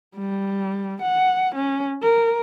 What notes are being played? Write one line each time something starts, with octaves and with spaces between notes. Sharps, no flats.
G3
F#5
C#4
A#4